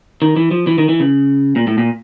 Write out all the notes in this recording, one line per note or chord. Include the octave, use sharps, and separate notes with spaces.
D#3
E3
F3
E3
D#3
E3
C#3
A#2
A2
A#2